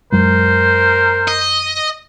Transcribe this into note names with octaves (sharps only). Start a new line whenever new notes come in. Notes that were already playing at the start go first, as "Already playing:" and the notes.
F#2 F#3 G#3 A#4 C5
D#5